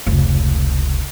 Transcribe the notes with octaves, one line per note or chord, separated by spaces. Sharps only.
F1 C#2